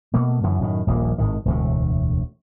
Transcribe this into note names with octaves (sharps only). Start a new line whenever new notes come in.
B2 A3 A#3
F#2 D3 E3
F#2 A2 D#3
D#1 A#1 B2 A#3
G#1 A2 D#3
E1 D2 A2